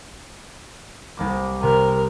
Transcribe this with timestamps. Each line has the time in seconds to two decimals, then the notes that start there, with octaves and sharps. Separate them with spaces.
1.17 C2 A#3 D6
1.63 C3 A#4